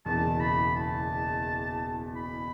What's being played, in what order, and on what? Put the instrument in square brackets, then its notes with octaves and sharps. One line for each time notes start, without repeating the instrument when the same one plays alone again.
[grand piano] F#1 E2 B2 [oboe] A5
[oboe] B5
A5
B5